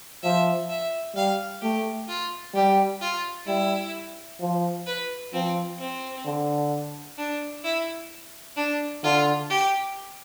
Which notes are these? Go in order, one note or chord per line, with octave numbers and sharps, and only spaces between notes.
F3 E5
E5
G3 F5
A3 G4
F4
G3 G4
F4
G3 E4
F3
B4
F3 C4
C4
D3
D4
E4
D4
D3 F4
G4